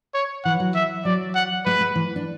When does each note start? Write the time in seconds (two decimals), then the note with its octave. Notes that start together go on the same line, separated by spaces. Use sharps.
0.14 C#5
0.45 E3 F#5
0.60 F#3
0.75 E5
1.05 F#3 D5
1.35 F#5
1.66 G#3 B4
1.81 G#3
1.96 E3
2.16 D4